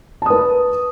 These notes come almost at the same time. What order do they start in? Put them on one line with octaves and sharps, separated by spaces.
A5 D#6 B4